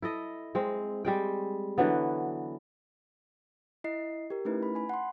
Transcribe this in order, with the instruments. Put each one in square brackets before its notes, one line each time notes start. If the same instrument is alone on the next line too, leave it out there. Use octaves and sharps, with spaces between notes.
[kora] E4 A4 D#5
G#3 C4
G3 G#3 G5
D3 E3 F#3 B3
[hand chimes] E4 D#5 C7
G4 A#4
A3 C#4 D#4 E4 B4
B5
G#5 B5
F#5 C6